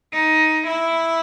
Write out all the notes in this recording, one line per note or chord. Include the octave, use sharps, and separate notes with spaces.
D#4
E4